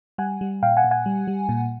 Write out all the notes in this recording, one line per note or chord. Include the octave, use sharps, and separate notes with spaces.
G3 F#5 G#5
G3
A#2 F5 G5
F#5 G#5
A#2
F#5 G#5
G3
G3
A#2